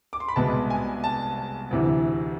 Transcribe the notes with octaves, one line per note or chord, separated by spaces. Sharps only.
D6
C6
B5
C2 B2 G#3 B3 A5
G#5
A5
D2 C3 E3